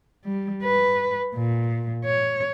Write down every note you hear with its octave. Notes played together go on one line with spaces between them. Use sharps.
G3
B4
A#2
C#5